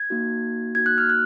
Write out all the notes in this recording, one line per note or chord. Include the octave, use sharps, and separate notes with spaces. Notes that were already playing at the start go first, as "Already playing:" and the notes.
Already playing: G#6
A#3 D#4 F#4
A#3 D#4 F#4 G#6
F#6
F6
F#6